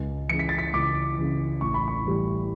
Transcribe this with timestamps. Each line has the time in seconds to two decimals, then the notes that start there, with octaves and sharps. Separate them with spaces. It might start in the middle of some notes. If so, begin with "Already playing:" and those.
Already playing: C#2
0.29 C#3 E3 C#7
0.39 B6
0.49 A6
0.58 B6
0.73 C#2 D6
1.18 C#3 E3
1.61 A1 C#6
1.74 B5
1.88 C#6
2.04 A2 E3 G3